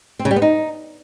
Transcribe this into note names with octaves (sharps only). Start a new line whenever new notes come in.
C4
C#3
G3
B3
D#4